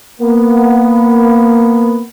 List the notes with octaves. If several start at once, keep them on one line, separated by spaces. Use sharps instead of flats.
A#3 B3